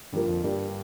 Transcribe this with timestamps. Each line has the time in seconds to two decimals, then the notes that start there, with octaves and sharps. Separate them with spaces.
0.13 G2 D3 F3 A#3 F4 A#4
0.28 F2
0.43 G2 A#3 D4 G4